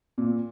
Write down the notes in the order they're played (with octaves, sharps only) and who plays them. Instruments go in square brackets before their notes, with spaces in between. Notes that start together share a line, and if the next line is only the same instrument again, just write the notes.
[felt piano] A#2